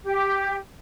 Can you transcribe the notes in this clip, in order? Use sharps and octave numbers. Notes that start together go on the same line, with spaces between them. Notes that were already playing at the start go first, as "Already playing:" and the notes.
G4